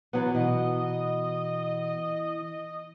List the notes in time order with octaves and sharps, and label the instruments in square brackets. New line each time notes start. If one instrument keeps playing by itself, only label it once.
[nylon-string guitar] E3 F#3 B3
[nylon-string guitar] B2 [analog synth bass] E3 [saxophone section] D#5